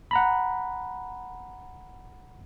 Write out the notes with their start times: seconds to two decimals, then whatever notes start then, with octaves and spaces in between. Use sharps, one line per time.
0.11 F#5 A#5 B5